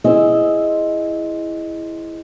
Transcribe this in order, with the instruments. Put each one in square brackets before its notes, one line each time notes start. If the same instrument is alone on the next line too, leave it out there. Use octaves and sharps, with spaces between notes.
[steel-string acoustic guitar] C4 E4 G#4 D#5